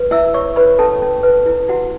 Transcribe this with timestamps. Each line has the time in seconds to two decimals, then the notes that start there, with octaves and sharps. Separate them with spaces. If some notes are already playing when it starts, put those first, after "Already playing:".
Already playing: B4
0.11 E4 E5 E6
0.34 E4 C#5 C#6
0.56 B4 B5
0.79 C#4 A4 A5
1.02 C#4
1.23 B4
1.46 E4
1.68 E4 F#4 F#5